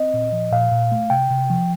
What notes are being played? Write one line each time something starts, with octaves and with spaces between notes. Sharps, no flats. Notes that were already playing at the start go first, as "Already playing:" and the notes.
Already playing: C4 D#5
A#2
F3
A#2 F5
A#2
A3
C3 G5
C3
F3